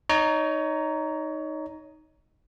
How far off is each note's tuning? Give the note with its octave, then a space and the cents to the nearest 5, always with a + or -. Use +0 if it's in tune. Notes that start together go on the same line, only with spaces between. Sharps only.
D#4 +0 C#5 +25 A#5 +0